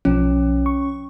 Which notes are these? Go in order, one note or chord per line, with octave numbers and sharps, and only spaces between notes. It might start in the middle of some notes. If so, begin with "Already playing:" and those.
B1 F3 C#4
C#6